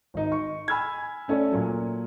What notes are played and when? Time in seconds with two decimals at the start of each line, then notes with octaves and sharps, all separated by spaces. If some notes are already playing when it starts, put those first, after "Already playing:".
0.14 G#1 D#4
0.32 C#6
0.68 G#5 B5 E6 F6 G#6
1.28 A3 C#4 A4 D5
1.52 A#2 F#3